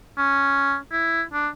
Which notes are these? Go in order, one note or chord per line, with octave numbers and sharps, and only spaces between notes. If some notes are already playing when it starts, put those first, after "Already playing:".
C#4
E4
D4